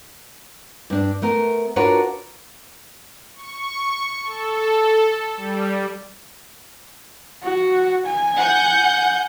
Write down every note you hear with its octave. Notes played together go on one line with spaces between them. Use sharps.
G2 D4
A3 B3 A#4
D4 F4 F#4 A#4 B4 C#5
C#6
A4
G3
F#4
G#5
F#5 G6